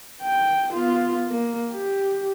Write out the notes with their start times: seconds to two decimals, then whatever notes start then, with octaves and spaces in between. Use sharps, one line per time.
0.21 G5
0.74 B3 F4
1.27 A#3
1.72 G4